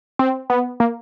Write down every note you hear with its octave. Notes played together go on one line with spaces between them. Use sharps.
C4
B3
A#3